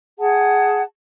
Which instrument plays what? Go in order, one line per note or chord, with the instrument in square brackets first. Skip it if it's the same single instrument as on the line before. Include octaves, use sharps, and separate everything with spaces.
[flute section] G#4 F#5 A5